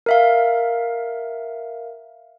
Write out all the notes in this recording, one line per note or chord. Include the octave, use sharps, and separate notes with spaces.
A#4 E5 F5